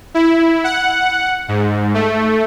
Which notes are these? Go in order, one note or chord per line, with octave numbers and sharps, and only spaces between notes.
E4
F#5
G#2
A3